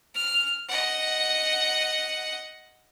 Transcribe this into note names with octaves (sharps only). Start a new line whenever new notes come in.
F6
D#5 F#5